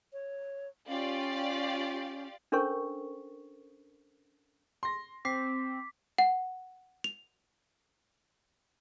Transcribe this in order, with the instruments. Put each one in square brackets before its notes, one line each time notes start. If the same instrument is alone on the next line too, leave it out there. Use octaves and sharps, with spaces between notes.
[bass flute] C#5
[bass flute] C#4 [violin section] F4 G4 D5
[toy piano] C#4 D4 A4 A#4 C5 C#6
[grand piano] C6 A#6
[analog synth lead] C4 [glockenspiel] D6 B6 [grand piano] C7
[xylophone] F#5
F7